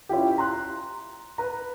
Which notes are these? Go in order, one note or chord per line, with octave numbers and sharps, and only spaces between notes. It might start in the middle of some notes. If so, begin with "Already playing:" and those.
C#4 E4 F4 G4
A#5 C6 F#6
B4 A#5